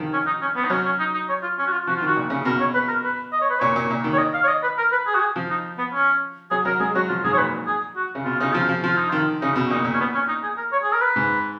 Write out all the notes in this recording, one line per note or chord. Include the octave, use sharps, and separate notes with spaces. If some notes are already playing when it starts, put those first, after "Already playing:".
Already playing: D#3 F3
C#4
D#4
C#4
B3
D#4
F#3 C#4
C#4
D#4
D#4
C#5
F4
C#4
F#4
F4
F3 F#4
F4
D#3
F#4
A#2
C#3
B2 A#4
C#5
B4
A#4
B4
D#5
C#5
B4
A#2 C#5
A#2
A#2
D#3
C#5
D#5
F5
C#5
D#5
B4
A#4
B4
G#4
F#4
G#4
F3
D#4
B3
C#4
F#3 G#4
F#3 A#4
G#3 G#4
F#3 F#4
F3 F4
G#2 G#4
C#5
A#2 B4
G#4
F#4
C#3
B2 F4
C#3 D#4
F3 F4
F3
F3 F4
D#4
D#3 F4
C#3 D#4
B2
A#2 D#4
A#2
C#4
B3
C#4
D#4
G#4
A#4
C#5
G#4
A#4
B4
G#2